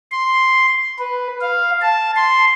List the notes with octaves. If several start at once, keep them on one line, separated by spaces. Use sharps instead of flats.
C6
B4
F5
A5
C6